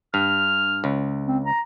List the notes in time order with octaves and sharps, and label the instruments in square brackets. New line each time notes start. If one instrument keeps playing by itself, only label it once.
[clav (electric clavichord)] G2 [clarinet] F6
[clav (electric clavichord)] C#2
[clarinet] C4
A#5